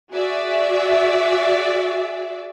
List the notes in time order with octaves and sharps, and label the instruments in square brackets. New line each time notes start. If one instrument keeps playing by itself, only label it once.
[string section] F#4 G#4 D5 E5